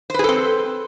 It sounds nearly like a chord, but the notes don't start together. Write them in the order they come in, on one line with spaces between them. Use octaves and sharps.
C5 B4 G#4 A4 C4